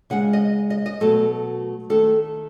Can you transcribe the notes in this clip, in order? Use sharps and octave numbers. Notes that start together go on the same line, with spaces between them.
C#3 G#3 F#5
D#5
D#5
D#5
B2 F#3 A3 A4
D#3 A3 A4